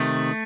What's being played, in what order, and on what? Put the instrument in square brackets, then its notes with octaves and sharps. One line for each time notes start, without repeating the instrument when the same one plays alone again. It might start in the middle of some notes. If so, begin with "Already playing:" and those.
Already playing: [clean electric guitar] C3 D#3 A3